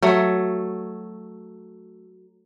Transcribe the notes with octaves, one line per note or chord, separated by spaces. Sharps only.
F#3 A3